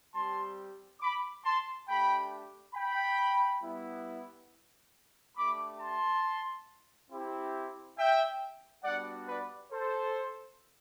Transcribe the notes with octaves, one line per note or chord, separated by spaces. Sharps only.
G3 C4 G4 A5 C6
B5 D6
A5 C6
A3 D4 G4 G5 B5
G5 B5
G3 B3 E4
A3 D4 G4 B5 D6
A5 C6
C4 E4 G4
E5 G5
G3 B3 D4 F#4 D5 F#5
B4 D5
A4 C5